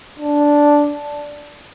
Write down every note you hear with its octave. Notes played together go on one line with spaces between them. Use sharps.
D4